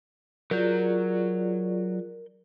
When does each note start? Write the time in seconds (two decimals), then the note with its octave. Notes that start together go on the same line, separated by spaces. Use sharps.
0.51 F#3 F4 G#4 A#4 D5 G6